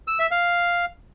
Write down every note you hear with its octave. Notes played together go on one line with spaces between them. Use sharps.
E6
E5
F5